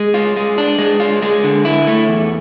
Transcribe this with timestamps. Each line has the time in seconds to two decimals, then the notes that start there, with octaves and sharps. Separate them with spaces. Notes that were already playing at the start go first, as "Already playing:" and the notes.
Already playing: G#3
0.14 F4
0.36 G#3
0.58 D4
0.78 G#3
1.00 F4
1.22 G#3
1.44 D3
1.65 E4
1.87 A3
2.09 E2